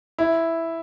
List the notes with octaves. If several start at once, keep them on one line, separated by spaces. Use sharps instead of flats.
E4